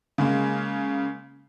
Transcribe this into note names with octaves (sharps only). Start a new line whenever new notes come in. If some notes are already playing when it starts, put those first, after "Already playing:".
C#3 G#3 A#3